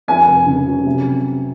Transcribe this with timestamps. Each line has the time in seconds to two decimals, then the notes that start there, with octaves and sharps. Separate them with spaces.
0.08 F2 G#5
0.27 F1
0.47 C#3
0.67 F#3
0.86 C3